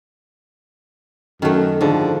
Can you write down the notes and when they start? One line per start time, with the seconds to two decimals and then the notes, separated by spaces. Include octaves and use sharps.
1.42 F#2 D#3 A3
1.81 G#2 D3 F3